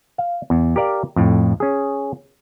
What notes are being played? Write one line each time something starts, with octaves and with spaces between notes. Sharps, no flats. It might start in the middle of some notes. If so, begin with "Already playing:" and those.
F5
E2
G4 A#4 D5 F5
F2 A2
C#4 G#4